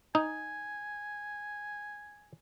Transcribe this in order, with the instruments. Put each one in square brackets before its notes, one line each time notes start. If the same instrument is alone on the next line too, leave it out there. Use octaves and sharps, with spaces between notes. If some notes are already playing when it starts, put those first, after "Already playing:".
[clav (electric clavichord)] D#4 [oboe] G#5